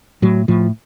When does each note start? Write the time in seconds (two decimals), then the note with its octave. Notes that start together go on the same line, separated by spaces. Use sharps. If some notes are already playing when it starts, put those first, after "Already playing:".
0.22 A2 F#3
0.48 A2 F3